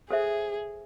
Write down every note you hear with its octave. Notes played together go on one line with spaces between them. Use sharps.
G#4 A4 C5 E5